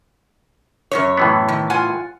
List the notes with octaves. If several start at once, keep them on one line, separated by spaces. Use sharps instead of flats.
F#2 C3 C#5
A2 E3 B3
D#3
F4 F#5 G#5